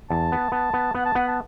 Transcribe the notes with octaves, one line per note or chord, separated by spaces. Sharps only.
E2 A5
B3
B3 A5
B3
B3 F#5
A5
B3 F#5
A5